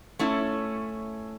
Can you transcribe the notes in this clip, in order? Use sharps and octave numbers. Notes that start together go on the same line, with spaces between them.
A3 C#4 E4